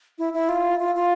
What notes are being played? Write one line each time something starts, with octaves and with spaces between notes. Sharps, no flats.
E4
E4
F4
F4
F4